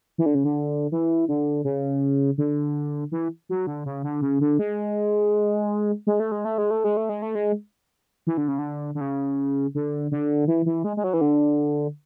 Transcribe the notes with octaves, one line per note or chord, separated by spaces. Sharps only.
E3
D3
C#3
D3
E3
D3
C#3
D3
E3
F#3
D3
C#3
D3
C#3
D3
G#3
G#3
A3
G#3
A3
G#3
A3
G#3
A3
G#3
A3
G#3
E3
D3
C#3
D3
D3
C#3
D3
D3
E3
E3
G#3
G#3
F#3
E3
D3